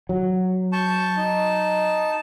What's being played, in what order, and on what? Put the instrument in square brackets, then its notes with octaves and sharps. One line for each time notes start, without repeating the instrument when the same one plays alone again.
[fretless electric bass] F#3
[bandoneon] A5 [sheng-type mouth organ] C#6 G6
[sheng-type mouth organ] D#4